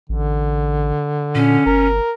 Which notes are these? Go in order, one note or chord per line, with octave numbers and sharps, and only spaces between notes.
A1 D3
A#2 C#4
G1 A#4